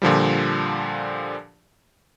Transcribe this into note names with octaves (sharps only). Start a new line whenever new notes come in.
A#2 D3 F3 G3